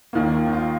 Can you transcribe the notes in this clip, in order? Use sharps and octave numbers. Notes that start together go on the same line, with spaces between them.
D#2 D#3 A#3 F4
F4
D#4
F4